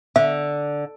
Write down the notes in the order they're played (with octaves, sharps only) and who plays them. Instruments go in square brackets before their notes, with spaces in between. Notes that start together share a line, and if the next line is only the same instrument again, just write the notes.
[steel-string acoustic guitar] D3 [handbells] E5